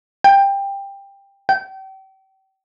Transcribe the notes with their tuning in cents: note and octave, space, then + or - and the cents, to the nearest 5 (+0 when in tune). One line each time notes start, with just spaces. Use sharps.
G5 +15
G5 -35